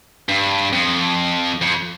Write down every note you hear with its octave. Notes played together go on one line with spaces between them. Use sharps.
G2
F2
F2